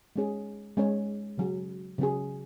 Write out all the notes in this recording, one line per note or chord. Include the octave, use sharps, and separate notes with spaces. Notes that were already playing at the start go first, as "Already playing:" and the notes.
G#3 C#4 G#4 C#5
G#3 C#4 G#4 C#5
C#3 F#3 C#4 G#4
C#3 F#3 C#4 G#4